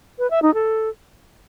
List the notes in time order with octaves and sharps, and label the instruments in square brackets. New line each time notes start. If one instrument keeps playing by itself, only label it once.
[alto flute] B4
E5
D#4
A4